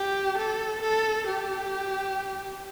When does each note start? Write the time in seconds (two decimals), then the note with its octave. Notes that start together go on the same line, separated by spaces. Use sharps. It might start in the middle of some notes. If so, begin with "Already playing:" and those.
Already playing: G4
0.37 A4
0.82 A4
1.27 G4